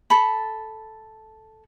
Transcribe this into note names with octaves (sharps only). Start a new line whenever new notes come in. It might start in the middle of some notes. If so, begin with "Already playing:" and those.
A4 A5 B5